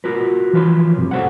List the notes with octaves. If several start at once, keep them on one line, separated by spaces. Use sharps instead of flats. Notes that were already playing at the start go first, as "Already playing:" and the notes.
F4 F#4 A#4 B4
E3 F3 F4 B4 C#5 C6
C2 F#2 C3
F#4 A4 C5 F5 F#5